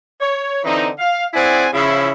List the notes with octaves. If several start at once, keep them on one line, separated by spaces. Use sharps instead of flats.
C#5
D3 E3 C4 D#4
F5
C4 E4 G#4 D5 F#5 G#5
C#3 F3 E4